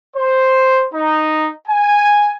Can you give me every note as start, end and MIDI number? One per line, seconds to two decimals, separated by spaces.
0.17 0.87 72
0.94 1.51 63
1.68 2.37 80